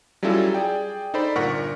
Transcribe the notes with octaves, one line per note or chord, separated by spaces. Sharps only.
F#3 G3 C#4 E4 F4 A4
G#4 D5 G5
D#4 A4 C5 D5 B5
G1 A#2 A#4 F#5 C#6 B6